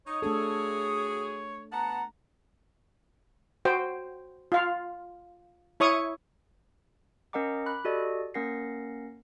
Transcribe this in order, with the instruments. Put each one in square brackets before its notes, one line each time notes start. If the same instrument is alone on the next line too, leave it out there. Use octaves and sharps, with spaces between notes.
[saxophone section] D#4 [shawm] C#5 [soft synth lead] D#6
[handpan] A3 D4 A4 [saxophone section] F#4 G#4
[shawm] C#5
[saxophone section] B3 F#5 [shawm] A5 [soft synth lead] A#5
[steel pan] F#4 C5 G5
F4 F5
E4 C#5 C#6 D#6
[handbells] C#4 A#4 D#5 F#5 A#5 D6
B5 D6 F#6
F#4 G4 A4 D5 D#5
A#3 C#4 A#4 F#5 A#6 C7